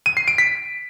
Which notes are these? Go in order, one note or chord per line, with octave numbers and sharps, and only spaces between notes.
D#7
C7
D7
B6